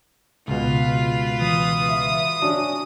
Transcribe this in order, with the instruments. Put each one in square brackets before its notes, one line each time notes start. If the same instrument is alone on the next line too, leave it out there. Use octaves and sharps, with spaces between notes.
[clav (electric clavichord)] C#2 B2 [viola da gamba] F4 B4
[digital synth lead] E3 [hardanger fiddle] D#6
[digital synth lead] E5
[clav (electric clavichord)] C#4 D4 [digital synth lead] F#4